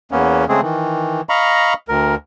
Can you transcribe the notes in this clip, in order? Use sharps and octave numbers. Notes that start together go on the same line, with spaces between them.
E2 A#3 B3 C#4
C#3 G#3 A3 C4 G#4
D#3 E3
D#5 F5 A#5 B5 C#6
D2 A#4